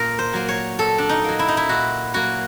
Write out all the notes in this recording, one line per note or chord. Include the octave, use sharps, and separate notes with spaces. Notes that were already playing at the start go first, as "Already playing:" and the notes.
Already playing: A#2 A#4
C5
F#3 A#3
C#5
A#2 A4
D4
D#4
F#3 A#3
E4
D#4
E4
A#2 F#4
F#3 A#3 F#4